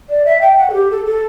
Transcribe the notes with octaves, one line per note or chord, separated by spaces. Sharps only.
D5
E5
G5
F#5
A4
G4
A4
A4